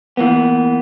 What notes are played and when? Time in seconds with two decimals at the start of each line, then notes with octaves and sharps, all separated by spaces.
0.17 E3 A#3 B3